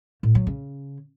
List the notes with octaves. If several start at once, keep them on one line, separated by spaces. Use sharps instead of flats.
A2
F#3
C#3